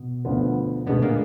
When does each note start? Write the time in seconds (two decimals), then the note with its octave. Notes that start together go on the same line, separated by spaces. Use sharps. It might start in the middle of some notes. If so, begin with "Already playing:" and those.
Already playing: B2
0.25 D2 D3 F3 B3
0.86 D2 B2 D3 G#3 B3 D4 G#4
1.02 A#2 A#3